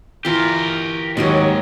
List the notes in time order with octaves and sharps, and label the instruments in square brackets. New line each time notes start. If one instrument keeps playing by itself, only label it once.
[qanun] E3 F4 [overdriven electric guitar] G4 A#4
[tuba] D#2 [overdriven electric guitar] G#2 [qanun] F#3 G3 D#5 [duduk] C#5